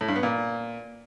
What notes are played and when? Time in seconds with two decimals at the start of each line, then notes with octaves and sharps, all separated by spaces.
0.01 A2
0.08 G2
0.16 B3
0.23 A#2